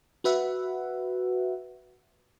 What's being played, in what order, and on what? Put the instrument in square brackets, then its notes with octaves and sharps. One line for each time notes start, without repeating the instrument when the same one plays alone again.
[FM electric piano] F#4 B4 E5 F#5